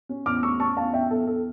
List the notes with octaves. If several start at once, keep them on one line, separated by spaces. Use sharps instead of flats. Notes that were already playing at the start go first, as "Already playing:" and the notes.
C#4
E2 D6 F6
A3 C#6 E6
C#4 A5 C#6
E2 F5 A5
E2 E5 G5
E2 A4
E2 A4